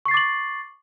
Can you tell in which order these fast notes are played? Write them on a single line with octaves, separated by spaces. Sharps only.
C#6 C7 A6 D6 F#7